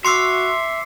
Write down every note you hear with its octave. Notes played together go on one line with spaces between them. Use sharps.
F#4 E5 C6 D6 E6 C7 C#7